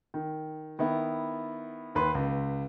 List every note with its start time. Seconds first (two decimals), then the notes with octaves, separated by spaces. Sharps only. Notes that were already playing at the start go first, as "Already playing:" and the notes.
0.14 D#3
0.79 D#3 B3 E4
1.95 D#2 B4 C6
2.15 C#2